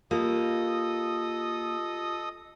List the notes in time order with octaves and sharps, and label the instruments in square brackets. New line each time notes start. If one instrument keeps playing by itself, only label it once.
[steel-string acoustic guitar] A#3 [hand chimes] F4 G4 [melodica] A4 D#5 D#6